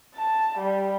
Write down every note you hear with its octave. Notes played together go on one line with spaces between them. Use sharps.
A5
G3